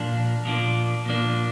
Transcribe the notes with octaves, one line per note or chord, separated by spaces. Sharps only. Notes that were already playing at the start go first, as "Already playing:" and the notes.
Already playing: A#2 F3 A#3 D4
A#2 F3 A#3 D4
A#2 F3 A#3 D4